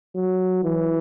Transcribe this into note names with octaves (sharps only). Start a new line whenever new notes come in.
F#3
E3